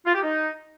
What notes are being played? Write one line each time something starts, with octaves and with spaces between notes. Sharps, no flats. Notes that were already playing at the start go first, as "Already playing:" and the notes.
F4
G4
D#4